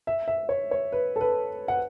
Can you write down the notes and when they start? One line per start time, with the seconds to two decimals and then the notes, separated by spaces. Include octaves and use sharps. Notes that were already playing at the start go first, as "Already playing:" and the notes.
0.07 E5
0.28 E5
0.49 C#5
0.71 C#5
0.92 B4
1.16 A4
1.21 B4
1.68 F#5